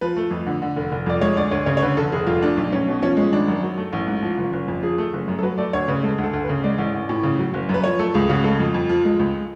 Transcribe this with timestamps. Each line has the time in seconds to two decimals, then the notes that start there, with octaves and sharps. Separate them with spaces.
0.01 F3 B4
0.17 A3
0.31 F2
0.46 D3
0.62 D3
0.76 F1
0.92 F1
1.06 F2 D5
1.21 G#3 C#5
1.36 D2 D5
1.51 D2 C#5
1.66 C#3 C#5
1.77 C#5
1.82 D3 B4
1.97 F1 A4
2.12 F1 G#4
2.27 F2 F4
2.42 A3 D4
2.57 B1
2.72 B1 C#4
2.88 B2
3.02 F3 C#4
3.17 G#3
3.33 G#1 D4
3.48 F#2
3.63 F#3
3.78 A3
3.93 A1
4.07 G#2
4.22 F3
4.38 F#1
4.53 F#1
4.68 F2
4.83 F3 G#4
4.98 A3
5.13 F#1
5.28 F#2
5.39 A4
5.43 F#3 B4
5.58 A3 D5
5.73 D2 C#5
5.88 C#3 B4
6.03 G#3 A4
6.18 D2
6.24 A4
6.33 D2
6.44 B4
6.49 C#3
6.64 G#3 D5
6.78 A1
6.94 A1
7.09 A2
7.23 C#3
7.39 F#3
7.54 F#1
7.69 F#2
7.74 B4
7.84 F3 C#5
7.99 A3 A4
8.14 C#2 G#4
8.29 C#3 F#4
8.44 G#3 A4
8.60 F2
8.74 F2
8.89 F3
9.05 G#3
9.19 C#2